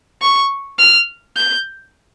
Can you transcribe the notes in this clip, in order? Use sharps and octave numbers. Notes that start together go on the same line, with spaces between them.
C#6
F6
G6